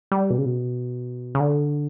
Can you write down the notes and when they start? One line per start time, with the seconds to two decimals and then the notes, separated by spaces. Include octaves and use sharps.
0.12 G3
0.30 B2
0.38 C#3
0.45 B2
1.35 C#3
1.40 D3